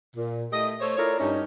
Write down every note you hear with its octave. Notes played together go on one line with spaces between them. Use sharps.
A#2
A3 E4 G4 D#5
A3 A4 C5 C#5
E4 F4 A4 A#4 C#5 D5
G2 C#4 D#4